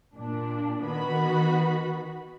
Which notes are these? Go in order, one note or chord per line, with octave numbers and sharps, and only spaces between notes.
A#2 D4
D#3 B3 F#4 B5